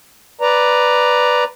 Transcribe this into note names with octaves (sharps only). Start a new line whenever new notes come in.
B4 D5 A#5